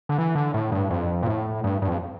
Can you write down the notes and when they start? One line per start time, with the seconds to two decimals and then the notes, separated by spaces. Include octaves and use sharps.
0.09 D3
0.18 E3
0.35 D3
0.54 A2
0.72 G2
0.90 F2
1.23 A#2
1.27 A2
1.64 G2
1.82 G2
1.88 F2